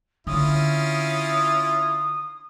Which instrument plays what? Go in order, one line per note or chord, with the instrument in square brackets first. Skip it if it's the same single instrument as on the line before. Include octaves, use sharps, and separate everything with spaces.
[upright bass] D3 [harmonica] C#4 E4 F4 [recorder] D#6